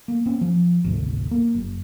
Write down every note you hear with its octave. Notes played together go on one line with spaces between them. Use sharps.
A#3
A#3 C4 C#4
F3
G#1 D2 C3
A#3
F#1